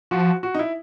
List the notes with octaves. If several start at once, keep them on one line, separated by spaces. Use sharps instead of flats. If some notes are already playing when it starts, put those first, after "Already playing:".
F3 F#4
F#4
D#4
E4